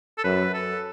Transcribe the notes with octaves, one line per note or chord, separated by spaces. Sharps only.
A4
F#2 B4
A4